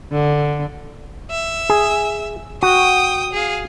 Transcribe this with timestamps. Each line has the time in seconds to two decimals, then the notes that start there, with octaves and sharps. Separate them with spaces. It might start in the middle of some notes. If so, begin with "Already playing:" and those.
0.12 D3
1.31 E5
1.70 G#4
2.63 F#4 G5 D#6
3.33 G#4 F5